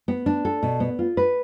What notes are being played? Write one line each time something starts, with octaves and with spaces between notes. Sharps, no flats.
B3
D4
A4
B2
B3
F4
B4